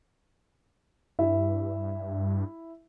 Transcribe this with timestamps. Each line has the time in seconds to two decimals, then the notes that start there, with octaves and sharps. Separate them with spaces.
1.19 G2 E4 E5